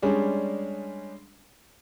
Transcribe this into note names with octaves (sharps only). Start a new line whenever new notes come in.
G3 G#3 C#4 D4 G#4